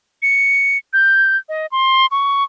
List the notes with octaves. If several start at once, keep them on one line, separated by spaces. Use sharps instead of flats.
C#7
G6
D#5
C6
C#6